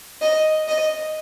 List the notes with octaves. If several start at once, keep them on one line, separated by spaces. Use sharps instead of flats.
D#5
D#5